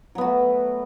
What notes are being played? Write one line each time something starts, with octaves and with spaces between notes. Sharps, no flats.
F#3 A3 B3 F#4